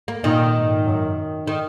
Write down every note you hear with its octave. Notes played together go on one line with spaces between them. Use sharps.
A#3
A#2 D#3
G#2
F#2
D#3